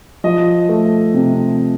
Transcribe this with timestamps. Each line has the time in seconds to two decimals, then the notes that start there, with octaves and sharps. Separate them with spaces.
0.24 F3 D#5
0.69 A3
1.14 C3